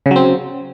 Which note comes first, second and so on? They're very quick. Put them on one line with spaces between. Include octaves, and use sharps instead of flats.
C#3 F#3 C4